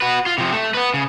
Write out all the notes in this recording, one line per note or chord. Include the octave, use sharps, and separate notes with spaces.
F#4 B4
F4
C3 F3
A3
B3 B4
C#3